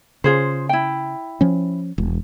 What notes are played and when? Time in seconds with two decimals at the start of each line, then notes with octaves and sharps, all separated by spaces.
0.24 C#3 F4 G#4 C5
0.69 E4 G5
1.41 F3 C#4
1.98 E1